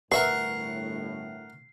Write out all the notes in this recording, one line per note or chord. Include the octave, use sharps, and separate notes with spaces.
G1 A2 A#4 B4 E5 F#5 C#6 C7